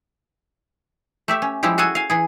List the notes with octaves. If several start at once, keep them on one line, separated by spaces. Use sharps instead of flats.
A3 G4 E5
C#4
F3 G3 G#3 E4 G4
F#4 G#4 A4 C#5 F#5 G#5
F5 G#5
E3 G#4